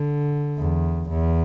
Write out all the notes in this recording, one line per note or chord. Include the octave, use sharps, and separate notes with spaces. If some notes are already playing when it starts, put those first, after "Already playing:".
Already playing: D3
E2
E2